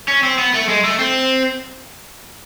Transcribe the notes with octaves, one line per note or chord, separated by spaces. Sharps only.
C#4
C4
B3
A3
G#3
A3
C4